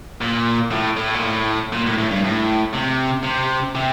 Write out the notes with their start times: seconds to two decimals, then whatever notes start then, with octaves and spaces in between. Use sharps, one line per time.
0.21 A#2
0.71 A2
0.97 A2
1.14 A#2
1.22 A2
1.73 A#2
1.86 A2
1.98 A2
2.11 G2
2.24 A2
2.74 C3
3.24 C3
3.75 C3